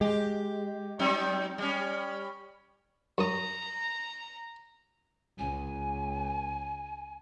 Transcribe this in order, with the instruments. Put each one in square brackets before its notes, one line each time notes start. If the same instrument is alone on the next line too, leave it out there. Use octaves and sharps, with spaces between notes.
[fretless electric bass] G#3 [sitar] G4
[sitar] F#3 C4 D#4
G3 C#4
[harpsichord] F#2 D#6 [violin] A#5
[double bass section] C#2 [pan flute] G#5